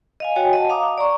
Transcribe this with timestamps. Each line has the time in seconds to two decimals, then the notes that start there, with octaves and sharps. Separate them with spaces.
0.20 D#5 F5 G#5
0.36 F#4 C#5 G5 G#5
0.53 D#5 F#5 A5
0.69 F5 A#5 D6 D#6
0.98 D5 A#5 C#6